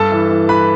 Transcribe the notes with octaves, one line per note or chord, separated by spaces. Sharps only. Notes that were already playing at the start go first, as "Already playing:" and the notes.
Already playing: G2 A4 A5
E3
E3
E3 B4 B5